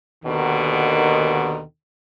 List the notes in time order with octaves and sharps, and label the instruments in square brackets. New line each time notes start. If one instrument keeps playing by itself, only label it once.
[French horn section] D#2 B2 D3 D#3